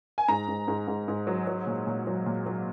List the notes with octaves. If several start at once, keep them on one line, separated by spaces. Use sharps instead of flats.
G#5
G#2 A#5
G#2
G#2
G#2
G#2
F#3
F#3
A#2
A#2
F#3
A#2
F#3